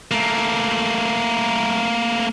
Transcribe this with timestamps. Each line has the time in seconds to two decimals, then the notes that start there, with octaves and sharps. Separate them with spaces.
0.11 A3 A#3